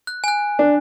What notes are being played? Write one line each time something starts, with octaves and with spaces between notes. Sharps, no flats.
F#6
G#5 F#6
D4